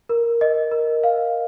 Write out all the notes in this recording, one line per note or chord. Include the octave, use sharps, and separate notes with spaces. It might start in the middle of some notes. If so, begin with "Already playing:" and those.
A#4
D#5
A#4
F5